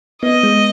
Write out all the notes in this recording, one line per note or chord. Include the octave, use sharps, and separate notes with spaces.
B3 D#5
G#3